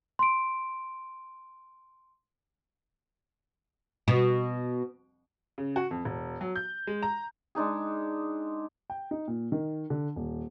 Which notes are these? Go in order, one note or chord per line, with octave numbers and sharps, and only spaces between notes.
C6 D7
B2
C#3
F#4
F2
E1
F#3
G6
G#3
A#5
G#3 D4 D#4 G#4
G5
D#4
A#2
D#3
D3
D#1